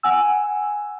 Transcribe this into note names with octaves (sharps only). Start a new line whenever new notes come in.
F#5 G#5 E6